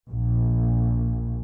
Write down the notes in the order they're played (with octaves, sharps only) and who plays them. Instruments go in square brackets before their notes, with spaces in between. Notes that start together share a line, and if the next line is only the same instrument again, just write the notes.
[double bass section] A#1